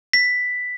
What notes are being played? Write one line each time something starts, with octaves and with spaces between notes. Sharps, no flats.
B6